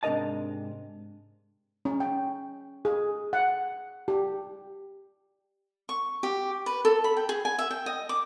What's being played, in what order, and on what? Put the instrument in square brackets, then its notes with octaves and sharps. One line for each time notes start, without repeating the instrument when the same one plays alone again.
[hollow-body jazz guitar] G#2 C3 D4 A#4 D#5 A5
[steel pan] C#4
G5
G#4
F#5
G4
[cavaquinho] C#6
G4
B4
A4
B5
G5
G#4
G#5
E5
G5
D#5
D6